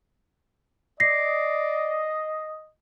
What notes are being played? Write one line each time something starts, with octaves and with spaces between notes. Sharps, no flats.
D5 D#5 A#6 C7